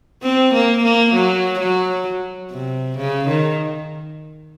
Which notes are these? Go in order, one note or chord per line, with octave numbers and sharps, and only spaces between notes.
C4
A#3
A#3
F#3
F#3
C3
C#3
D#3